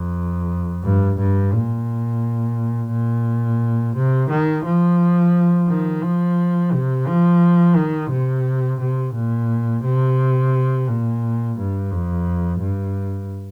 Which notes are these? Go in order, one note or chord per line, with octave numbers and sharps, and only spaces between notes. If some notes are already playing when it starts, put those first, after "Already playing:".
Already playing: F2
G2
G2
A#2
A#2
C3
D#3
F3
D#3
F3
C3
F3
D#3
C3
C3
A#2
C3
A#2
G2
F2
G2